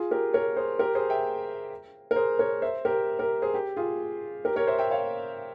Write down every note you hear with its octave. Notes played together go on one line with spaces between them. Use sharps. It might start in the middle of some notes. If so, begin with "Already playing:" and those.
Already playing: F4 G#4
G4 A#4
A#4 C#5
G#4 C5
G4 A#4
G#4 C5
E5 G5
A#4
G#4 C5
A#4 C#5
C5 E5
G4 A#4
G4 A#4
G#4 C5
G4
F4 G#4
G4 A#4
A#4 C#5
C5 E5
E5 G5
C#5 F5